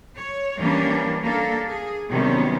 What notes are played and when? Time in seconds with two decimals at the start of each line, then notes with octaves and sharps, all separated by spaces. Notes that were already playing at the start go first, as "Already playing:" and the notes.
0.16 C#5
0.59 E3 G3 A#3 C#4 D4
1.24 A#3 D4 A4
1.70 G#4
2.11 C3 D#3 F#3 G3 B3 C#4